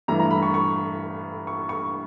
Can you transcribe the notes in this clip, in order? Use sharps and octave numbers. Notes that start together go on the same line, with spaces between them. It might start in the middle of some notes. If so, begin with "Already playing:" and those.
G2 E3 A3 A#5
A#5
B5
C#6
C#6
C#6
C#6